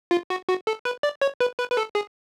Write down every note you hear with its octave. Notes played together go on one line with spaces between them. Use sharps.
F4
F#4
F#4
A4
B4
D5
C#5
B4
B4
B4
A4
G#4